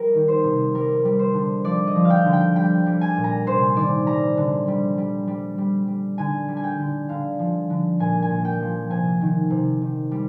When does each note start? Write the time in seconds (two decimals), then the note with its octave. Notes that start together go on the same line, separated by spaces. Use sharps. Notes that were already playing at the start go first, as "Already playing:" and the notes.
Already playing: G3 A#4
0.14 D#3
0.28 C5
0.44 C3
0.74 G3 A#4
1.05 G3
1.19 C5
1.34 D3
1.64 F3 D5
1.87 D#5
1.95 F3
2.05 F5
2.10 G5
2.25 D3
2.33 G5
2.56 G3 G5
2.86 G3
3.01 G#5
3.16 A#2
3.24 A#5
3.46 C3 C5
3.76 D#3 D5
4.06 G3 A#5
4.37 D3
4.68 G3
4.98 G3
5.27 G3
5.58 G3
5.88 G3
6.18 D3 G#5
6.48 G3
6.57 G#5
6.64 G5
6.79 D3
7.09 D3 F5
7.39 F3
7.70 D3
7.99 A#2 G#5
8.22 G#5
8.30 A#2
8.45 G5
8.61 F3
8.90 C3 G#5
9.21 D#3
9.50 C3
9.82 D#3
10.11 G3